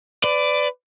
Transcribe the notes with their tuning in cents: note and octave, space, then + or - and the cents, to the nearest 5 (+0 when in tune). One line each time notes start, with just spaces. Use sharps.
B4 +30 D5 +0